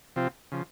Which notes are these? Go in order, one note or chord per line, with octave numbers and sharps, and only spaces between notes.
C3 F3 C4 F4
C#3 F3